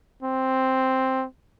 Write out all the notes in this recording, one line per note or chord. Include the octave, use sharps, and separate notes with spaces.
C4